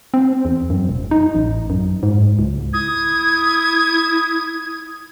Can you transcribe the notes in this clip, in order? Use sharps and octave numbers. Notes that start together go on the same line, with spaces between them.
C4
E2
F#2
E1
D#4
A1
F#2
G#2
C#2
E4 D#6 G#6